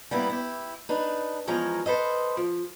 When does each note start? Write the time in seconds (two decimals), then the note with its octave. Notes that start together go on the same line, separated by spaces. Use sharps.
0.11 G3 A#3 B3 E4
0.29 E4 G4
0.89 D4 D#4 B4
1.47 E2 F3 G#3 C#4 A#5
1.86 A4 B4 C5 D#5
2.37 F3